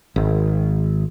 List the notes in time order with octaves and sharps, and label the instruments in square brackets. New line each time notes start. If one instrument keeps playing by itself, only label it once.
[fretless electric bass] G#1